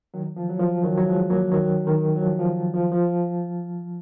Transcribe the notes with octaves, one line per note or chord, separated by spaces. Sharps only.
D#3 F#3
F3
F#3
F3
D#3 F#3
F#3
F3 G#3
F#3 A#3
D#3 F#3
D#3
F#3
F3
F3
F3
F3